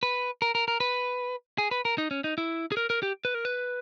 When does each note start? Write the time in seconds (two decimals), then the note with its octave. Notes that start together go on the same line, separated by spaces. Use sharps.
0.03 B4
0.42 A#4
0.55 A#4
0.68 A#4
0.80 B4
1.58 G#4
1.71 B4
1.85 A#4
1.98 D#4
2.11 C#4
2.24 D#4
2.38 E4
2.72 G#4
2.77 A#4
2.90 A#4
3.03 G4
3.25 B4
3.34 A#4
3.45 B4